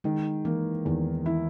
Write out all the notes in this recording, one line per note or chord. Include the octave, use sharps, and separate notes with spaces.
D#3 G#3
E3 A#3
E2 D#3
E3 E4